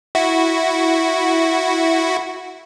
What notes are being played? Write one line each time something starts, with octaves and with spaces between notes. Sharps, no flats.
E4 F#4